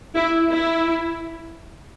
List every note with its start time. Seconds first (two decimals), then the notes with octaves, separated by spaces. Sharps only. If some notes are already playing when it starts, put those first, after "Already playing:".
0.16 E4
0.50 E4